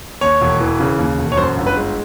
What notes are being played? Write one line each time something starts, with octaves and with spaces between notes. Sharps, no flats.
D#2 C#5
E1
E3
C#3
D#2
E1
C#5
F#2 C5
G1
B4
G#3